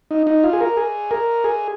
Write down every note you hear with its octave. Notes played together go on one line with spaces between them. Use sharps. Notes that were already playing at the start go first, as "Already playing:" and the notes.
D#4
D#4
F4
G#4
A#4
G#4
A#4
G#4